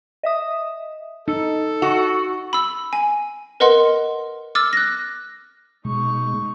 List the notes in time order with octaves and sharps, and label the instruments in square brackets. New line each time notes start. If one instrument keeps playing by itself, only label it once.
[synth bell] D#5 E5 D#6
[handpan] D#4 [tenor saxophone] A4
[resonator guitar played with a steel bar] F#4
[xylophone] B5 E6
G#5
A#4 B4 D#5 F#5 C6
D6 E6 F6 A6
F#6 A#6
[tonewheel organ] B2 G#3 [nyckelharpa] D#4 C#6